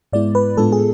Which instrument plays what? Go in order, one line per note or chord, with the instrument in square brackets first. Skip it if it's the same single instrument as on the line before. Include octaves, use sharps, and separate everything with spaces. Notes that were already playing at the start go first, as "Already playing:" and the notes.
[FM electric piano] G#2 G#3 B3 E4 D5
B4
A2 G#3 B3 D4 F4 A4
G#4